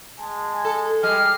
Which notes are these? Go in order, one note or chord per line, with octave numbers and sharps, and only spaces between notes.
G#3 G#5 A5
A4
G3 G#3 F6